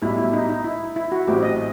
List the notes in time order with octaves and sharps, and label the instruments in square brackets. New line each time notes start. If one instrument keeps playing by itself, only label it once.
[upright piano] B1 A2 G3 [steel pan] E4
[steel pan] E4
D#4
D#4
E4
E4
F#4
[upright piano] A1 A2 F#3 C4 E4 [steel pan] G4
[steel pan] D#5